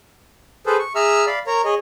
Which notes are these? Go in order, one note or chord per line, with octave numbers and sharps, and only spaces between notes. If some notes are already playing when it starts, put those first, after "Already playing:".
G#4 A4 B4 C5
C#6
G#4 E5 A#5 E6 F6
D5 F5 B5
A#4 C#5 A#5
G#4 C#5 D#5